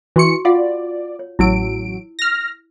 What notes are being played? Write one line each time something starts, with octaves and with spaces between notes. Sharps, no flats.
E3 F#4 C6 C#6 C#7
F4 D5 F5 F#5
C#5
A1 F#3 E4 E6 D7
F6 A#6